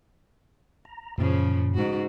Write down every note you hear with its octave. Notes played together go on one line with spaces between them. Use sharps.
A#5
F#2 A#2 C#3 F3
G#2 F#4